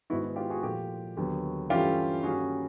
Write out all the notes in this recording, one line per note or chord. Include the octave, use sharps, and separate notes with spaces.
G#2 D#3 G#3 B3 E4 F#4
E4
F4 G4
F#4 G#4
A#2 F3 A3 F4 G4
D#2 D3 F#3 B3
G2 E3 A3 C#4 F4 G4
G2 D#3 G3 A#3 C#4 F#4 G#4